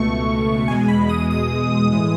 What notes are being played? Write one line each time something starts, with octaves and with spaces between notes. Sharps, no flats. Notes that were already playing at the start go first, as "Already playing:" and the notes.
Already playing: C#2 B2 A3 C#6
E2 B2 G#3 G#5
B5
D#6
D#6
A2 E3 G#3 D#6